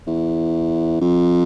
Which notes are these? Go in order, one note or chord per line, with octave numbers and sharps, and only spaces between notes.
E2
F2